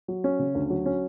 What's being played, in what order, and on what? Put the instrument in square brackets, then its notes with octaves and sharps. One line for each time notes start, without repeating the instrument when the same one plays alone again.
[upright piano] F#3
C#4
C#3
D2
F#3
C#4